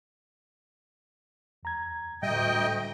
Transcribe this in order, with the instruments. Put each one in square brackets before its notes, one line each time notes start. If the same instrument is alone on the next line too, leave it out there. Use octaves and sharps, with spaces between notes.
[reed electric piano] E2 A#5 G#6
[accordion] D2 D#5 G5 [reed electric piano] A2 G3 E5